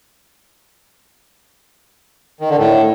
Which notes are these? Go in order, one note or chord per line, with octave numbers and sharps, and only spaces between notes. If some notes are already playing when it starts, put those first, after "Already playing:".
D#3
D3
A2